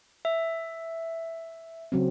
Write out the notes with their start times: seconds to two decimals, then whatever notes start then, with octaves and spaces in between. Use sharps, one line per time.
0.25 E5
1.92 C#3 F#3 C4